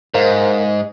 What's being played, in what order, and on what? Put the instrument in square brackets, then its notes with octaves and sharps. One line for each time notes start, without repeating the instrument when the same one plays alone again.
[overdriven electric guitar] G#2 [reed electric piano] A#4 C5 F5